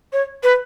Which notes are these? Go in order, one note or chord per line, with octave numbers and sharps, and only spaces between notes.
C#5
B4